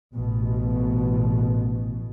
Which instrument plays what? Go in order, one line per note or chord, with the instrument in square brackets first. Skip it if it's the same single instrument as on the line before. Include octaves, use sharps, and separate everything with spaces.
[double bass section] A1 B2